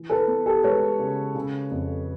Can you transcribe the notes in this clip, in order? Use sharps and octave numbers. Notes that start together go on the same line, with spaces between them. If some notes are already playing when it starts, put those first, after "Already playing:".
Already playing: E3
A4 B4
B3
G4 A4
G#3 B4 C#5
C#3
C#3
F2